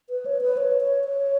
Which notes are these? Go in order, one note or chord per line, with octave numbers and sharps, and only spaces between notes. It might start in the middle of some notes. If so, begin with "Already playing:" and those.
B4
C#5
B4
C#5
C#5
C#5